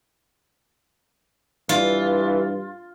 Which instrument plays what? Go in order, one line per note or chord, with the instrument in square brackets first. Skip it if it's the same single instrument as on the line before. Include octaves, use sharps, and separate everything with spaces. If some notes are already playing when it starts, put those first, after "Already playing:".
[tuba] G2 [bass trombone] E3 [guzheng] F4